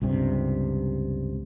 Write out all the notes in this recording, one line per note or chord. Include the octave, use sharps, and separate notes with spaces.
C#2 G2 C3